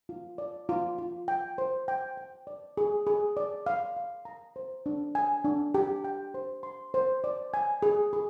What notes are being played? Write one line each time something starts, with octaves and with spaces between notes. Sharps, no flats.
F4
D5
F4
F4
G5
C5
G5
G5
D5
G#4
G#4
D5
F5
F5
A#5
C5
D4
G#5
D4
G4
G5
C5
C6
C5
D5
G#5
G#4
G#4